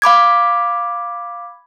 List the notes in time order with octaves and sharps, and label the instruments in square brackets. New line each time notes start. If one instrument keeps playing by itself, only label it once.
[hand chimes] F5 B5 D6 G#6